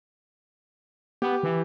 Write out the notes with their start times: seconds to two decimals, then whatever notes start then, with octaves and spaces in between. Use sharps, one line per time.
1.22 B3 G4
1.43 E3